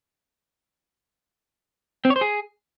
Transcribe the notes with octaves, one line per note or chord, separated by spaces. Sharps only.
C4
C#5
C5
G#4